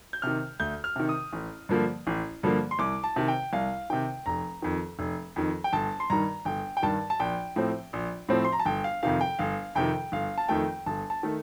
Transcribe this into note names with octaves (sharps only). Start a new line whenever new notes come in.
G6
C3 D#3 F6
D2 G6
F6
C3 D#3
D#6
A1
G2 D3 F3 A#3
A1
G2 D3 F3 A#3
C6
C2 D6
A5
C3 D#3
G5
C2 F5
C3 D#3 G5
F1 A#5
F2 D#3
F1
F2 D#3
G5
G1 A5
C6
G2 D#3 A#5
G1 G5
G5
G2 D#3 A5
A5
A#1 G5
A2 F3 C4
A#1
A2 F3 C4
C6
A#5
A5
G1 G5
F5
F2 C3 D#3 F5
G5
G1 F5
F2 C3 D#3 G5
G1 F5
A5
F2 D#3 A3 G5
G1 A5
A5
D#3 A3